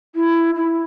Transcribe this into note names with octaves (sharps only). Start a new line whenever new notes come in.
E4
E4